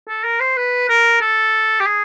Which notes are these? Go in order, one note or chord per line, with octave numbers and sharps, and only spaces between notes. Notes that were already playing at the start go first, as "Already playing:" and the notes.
A4
A#4
C5
B4
A#4
A4
G4
G#4